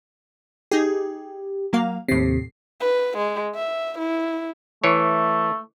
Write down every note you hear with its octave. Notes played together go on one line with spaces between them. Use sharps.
D#4 G4 G#4
F#3 A#3 F5
D#2 A2 C3 C7
B4
G#3
E5
E4
E3 A3 C#5